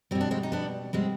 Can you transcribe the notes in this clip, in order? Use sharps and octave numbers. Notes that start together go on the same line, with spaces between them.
B2 G3 C4
D4
G#3 C4
D#4
B3 D4
B2 G3 G#3 C4